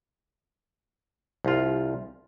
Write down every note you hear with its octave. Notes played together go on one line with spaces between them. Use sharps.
C2 F4